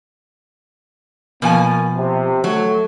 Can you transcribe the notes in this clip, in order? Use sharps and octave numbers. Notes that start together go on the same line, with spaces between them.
B2 F3 A#3 G#5
C3
F#3 A3